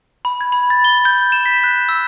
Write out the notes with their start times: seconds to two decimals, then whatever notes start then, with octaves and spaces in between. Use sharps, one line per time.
0.25 B5
0.41 G#6
0.52 B5
0.70 A6
0.84 G7
1.05 G6
1.32 E7
1.46 B6
1.64 F#6
1.89 E6